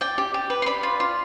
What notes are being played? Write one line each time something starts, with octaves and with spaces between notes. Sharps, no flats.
D5 G5
G4
G4
B4
C6
D5 B5
F4
F4